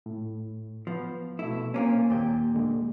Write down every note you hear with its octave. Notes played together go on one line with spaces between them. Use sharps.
A2
F3 B3
B2 A3 E4
A#2 A#3 C4 C#4 A#4 G#5
D#2 A#2 G4
D3 G#3